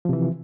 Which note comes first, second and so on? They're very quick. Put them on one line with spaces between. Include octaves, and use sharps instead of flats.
F3 C3 E3